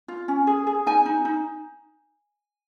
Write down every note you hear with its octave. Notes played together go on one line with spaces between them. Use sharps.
F4
C#4
G#4
G#4
D#4 G#5
D#4
D#4